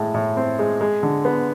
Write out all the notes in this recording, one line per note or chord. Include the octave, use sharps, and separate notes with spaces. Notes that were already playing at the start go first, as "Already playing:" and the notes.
Already playing: A2 G#3
A2
C4
G#3
G#3
D3
B3